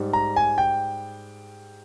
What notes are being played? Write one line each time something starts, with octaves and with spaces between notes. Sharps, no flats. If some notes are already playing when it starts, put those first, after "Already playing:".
Already playing: G#2 G3
A#5
G#5
G5